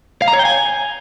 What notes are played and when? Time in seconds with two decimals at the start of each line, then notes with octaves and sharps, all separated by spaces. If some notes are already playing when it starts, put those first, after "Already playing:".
0.22 F5
0.28 A#5
0.33 C#5
0.39 G5
0.45 G#5